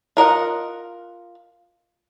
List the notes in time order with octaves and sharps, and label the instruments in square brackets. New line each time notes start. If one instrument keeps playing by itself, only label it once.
[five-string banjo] F4 A#4 D#5 F#5